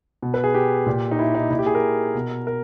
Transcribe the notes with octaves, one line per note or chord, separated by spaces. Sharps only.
B2
B4
G#4
G4
A#2
D#4
E4
D#4
A#2 E4
G4
G#4
A#4
B2
A#4